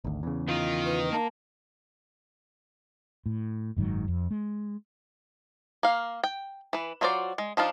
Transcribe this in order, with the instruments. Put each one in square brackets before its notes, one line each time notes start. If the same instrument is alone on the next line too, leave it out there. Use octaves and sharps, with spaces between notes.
[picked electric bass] G#1 D2
E2 C#3
[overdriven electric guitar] D#3 D#4 [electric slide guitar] F4
[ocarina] B4
[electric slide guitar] A#3 A#4 [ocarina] A5
[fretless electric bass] A2
F#1 G#2 D#3 F#3
F2
G#3
[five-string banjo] A#3 F5
G5
E3 B4
F#3 F4 F#4 C5 D5
G#3
F3 D4 D#4 F4